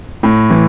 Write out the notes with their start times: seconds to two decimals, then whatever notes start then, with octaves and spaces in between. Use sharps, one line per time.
0.23 A2
0.50 E3